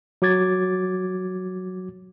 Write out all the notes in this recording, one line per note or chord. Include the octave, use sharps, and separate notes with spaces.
F#3 F#4 D6 G#6 A6